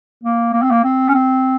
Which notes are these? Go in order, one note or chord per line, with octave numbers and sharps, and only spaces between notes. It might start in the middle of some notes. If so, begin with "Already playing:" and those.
A#3
A#3
C4
A#3
C4
C#4
C4